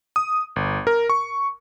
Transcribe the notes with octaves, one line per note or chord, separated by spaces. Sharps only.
D#6
G1
A#4
C#6